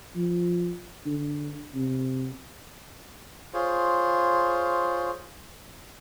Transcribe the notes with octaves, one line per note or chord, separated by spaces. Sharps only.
F3
D3
C3
F4 G#4 C5 C#5